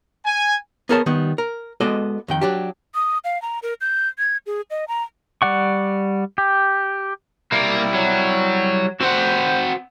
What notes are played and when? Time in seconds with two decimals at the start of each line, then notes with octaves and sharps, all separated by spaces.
0.24 G#5
0.89 B3 G#4 A#4 C#5 F5 A5
1.06 D#3 G3 B3
1.38 A#4
1.80 G#3 B3 F#4 A4 D5 D#5
2.28 F2 D#3 G5
2.41 F#3 D4 G4
2.95 D#6
3.24 F5
3.42 A#5
3.63 A#4
3.81 G6
4.18 G#6
4.46 G#4
4.70 D#5
4.88 A#5
5.42 G3 D5 F#5 C#6
6.38 G4
7.52 G3 A#3 E4
7.94 F#3
9.01 C4 F#4 C5 F#5